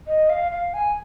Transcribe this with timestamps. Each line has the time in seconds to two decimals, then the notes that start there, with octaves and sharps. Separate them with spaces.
0.07 D#5
0.30 F5
0.52 F5
0.74 G#5